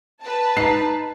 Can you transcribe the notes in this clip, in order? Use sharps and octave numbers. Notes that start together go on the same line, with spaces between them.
B4 A5
D#4 C7